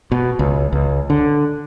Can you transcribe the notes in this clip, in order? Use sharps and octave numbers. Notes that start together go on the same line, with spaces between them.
B2
C#2
C#2
D3